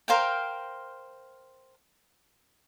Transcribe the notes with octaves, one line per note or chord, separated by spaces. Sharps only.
A#4 C5 F5 G5